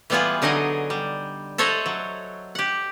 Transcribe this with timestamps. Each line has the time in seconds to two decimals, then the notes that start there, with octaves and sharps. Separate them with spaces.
0.10 E3 G3 B3 F4 G#4 F#5
0.42 D3 F#3 D#4 G#4 D#5
0.90 G3
1.58 A4 C5 C#5 D#5 E5 F#5
1.86 F#3
2.55 G4 F#5